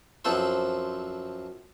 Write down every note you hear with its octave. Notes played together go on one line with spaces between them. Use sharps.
F#2 F3 C4 A4 B4 C5